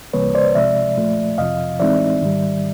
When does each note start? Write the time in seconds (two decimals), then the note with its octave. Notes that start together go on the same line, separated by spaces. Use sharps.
0.13 C2 C3 E3 G3 A#3 B4 C#5
0.35 C5 D5
0.55 C3 F3 G#3 D5 E5
0.97 A#2 F3 A3
1.38 F2 C3 F3 D#5 F5
1.80 A2 E3 G#3 C4 D#4 D5 E5
2.21 G#2 D#3 G3